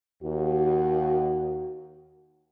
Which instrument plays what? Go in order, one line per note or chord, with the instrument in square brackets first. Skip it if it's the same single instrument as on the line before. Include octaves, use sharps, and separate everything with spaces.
[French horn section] D#2 F#4